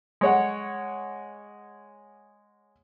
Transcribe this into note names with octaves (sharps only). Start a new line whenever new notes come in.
G#3 C#5 F#5